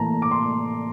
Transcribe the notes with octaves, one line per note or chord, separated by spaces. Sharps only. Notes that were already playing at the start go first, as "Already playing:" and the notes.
Already playing: A2 E3 A#3 A5 A#5
D6
C6